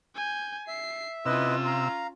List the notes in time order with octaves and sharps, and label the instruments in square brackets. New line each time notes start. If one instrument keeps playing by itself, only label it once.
[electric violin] G#5 G6
[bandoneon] E5 [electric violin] C7
[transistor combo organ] C3 E6 [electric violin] C#4 F4 [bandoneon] E4 B4 D#5
[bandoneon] F5 A#5